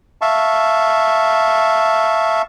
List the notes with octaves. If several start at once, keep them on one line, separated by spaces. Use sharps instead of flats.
E5 F5 A5 C#6